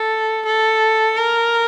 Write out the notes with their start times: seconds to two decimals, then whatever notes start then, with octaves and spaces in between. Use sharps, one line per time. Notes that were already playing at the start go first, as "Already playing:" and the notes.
Already playing: A4
0.45 A4
1.17 A#4